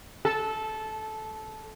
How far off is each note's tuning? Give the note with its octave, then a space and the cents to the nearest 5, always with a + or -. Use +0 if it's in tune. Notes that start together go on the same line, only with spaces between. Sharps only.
A4 -15